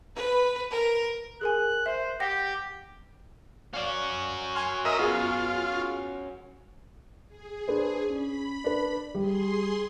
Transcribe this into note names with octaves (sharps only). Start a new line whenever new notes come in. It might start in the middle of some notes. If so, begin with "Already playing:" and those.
B4
A#4
G#4 A#4 G#5 F#6
C5 E5
G4 F#5 G5 A#6
C#4 F#4 D5 F5
G#5 C6 F6
A#4 D#5 E5
B3 F4 G#4
G#4
D4 B4 C5
C#4 B5
D4 B4
G3 G#4 C6